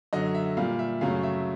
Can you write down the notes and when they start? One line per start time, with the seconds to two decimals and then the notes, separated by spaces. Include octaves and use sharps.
0.13 F#2 D3 F#3 D#5
0.35 E5
0.57 A#2 G3 F5
0.79 E5
1.01 F#2 C#3 F#3 A3 F5
1.23 E5